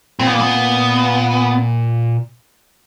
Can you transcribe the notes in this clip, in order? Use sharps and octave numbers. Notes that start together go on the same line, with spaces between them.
A#2 C4
B3
A#3
B3